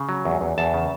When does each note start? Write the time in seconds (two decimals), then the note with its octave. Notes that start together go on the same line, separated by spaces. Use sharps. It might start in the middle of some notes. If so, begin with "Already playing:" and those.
Already playing: C#3
0.09 F#3
0.25 E2
0.41 E2
0.58 E2 A5
0.74 C#3